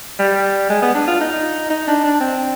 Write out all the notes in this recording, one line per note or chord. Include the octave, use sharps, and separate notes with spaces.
G3
G#3
B3
D4
F4
D#4
D#4
D4
D4
C4